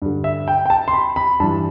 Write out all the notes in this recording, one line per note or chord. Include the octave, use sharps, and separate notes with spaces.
G2 D3
E5
G5
G5
A5
C6
B5
B5
G2 E3 A5